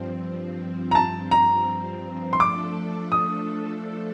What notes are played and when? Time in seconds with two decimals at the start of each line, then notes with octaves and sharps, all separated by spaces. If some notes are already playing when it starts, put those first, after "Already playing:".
Already playing: G2 F3 C4
0.91 A#5
0.95 A5
1.31 A#5
2.33 C6
2.39 F3 A3 D4 A4 D6
3.12 D#6